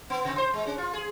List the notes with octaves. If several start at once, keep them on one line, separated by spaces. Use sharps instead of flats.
B3
C3
C5
G#3
C#4
F4
G#4